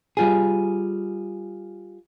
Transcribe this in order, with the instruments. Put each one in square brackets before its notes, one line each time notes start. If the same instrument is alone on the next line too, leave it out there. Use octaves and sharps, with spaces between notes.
[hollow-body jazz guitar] G3 F4 G#4